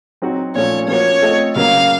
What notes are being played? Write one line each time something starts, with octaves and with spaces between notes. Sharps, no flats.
F#3 C4 D#4 F#4
A#2 F3 A3 C#4 C#5
F3 A#3 C#4 F#4 C#5
A3 C4 F4 A4 D#5
C#3 F#3 A#3 F5